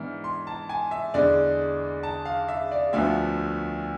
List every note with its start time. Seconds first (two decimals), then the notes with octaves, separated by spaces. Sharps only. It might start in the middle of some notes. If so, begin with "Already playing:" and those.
Already playing: G#2 E3 B3 D4 F6
0.24 C6
0.47 A5
0.69 G#5
0.91 E5
1.14 E2 D3 G#3 D5
2.03 A5
2.25 F5
2.48 E5
2.71 D5
2.93 D2 D3 F3 B3 E5